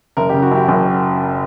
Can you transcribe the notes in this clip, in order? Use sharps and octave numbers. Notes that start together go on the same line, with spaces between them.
F#1 A#4
C#3 G4
F#4
F#2 G4
F#1